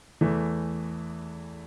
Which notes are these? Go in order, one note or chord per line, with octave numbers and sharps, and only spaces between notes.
E2 E3 A3